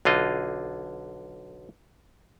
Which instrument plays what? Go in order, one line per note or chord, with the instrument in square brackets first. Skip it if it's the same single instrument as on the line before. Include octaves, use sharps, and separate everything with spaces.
[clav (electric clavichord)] B1 D3 F4 D#5